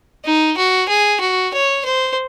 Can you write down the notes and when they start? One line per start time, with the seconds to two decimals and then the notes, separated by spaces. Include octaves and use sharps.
0.25 D#4
0.57 F#4
0.88 G#4
1.21 F#4
1.54 C#5
1.85 C5